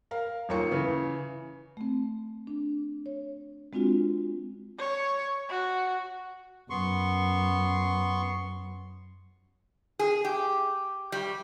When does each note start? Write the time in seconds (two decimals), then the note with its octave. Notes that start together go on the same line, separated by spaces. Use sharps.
0.11 A#4 F5
0.49 D#1 D#2 A#3 F4 C#5 C#7
0.71 C#3 E3
1.77 A3 C4
2.47 D4
3.06 C#5
3.73 G#3 C4 D4 F4 F#4
4.79 C#5
5.49 F#4
6.70 F#2 B3 C6 C#6
9.99 G#4
10.25 G4
11.12 G3